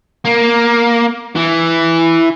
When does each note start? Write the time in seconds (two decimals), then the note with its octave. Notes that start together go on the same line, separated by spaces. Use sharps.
0.25 A#3
1.36 E3